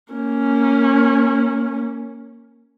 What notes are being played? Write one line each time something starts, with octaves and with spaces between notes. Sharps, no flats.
A#3 C#4